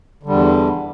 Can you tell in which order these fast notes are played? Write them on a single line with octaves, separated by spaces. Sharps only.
D3 G3 E2